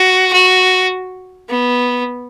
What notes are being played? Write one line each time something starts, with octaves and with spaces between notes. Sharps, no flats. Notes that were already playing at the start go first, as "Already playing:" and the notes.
Already playing: F#4
F#4
B3